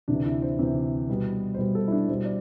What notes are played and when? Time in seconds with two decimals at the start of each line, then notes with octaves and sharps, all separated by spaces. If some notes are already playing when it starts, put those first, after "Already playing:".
0.08 D2 C3 E3 D4
0.25 E4
0.42 C5
0.59 D2 C3 E3
1.09 B2 G3 B3
1.54 C5
1.58 B2 G3 B3 B4
1.75 A4
1.88 E4
1.92 D4
2.08 B2 G3 B3 C5
2.25 D5